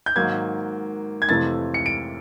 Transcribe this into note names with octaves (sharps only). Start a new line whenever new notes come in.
G6
G#2 D#3 F#3 A#3 G#6
G#6
F2 C3 E3 A3 A6
C#7
D7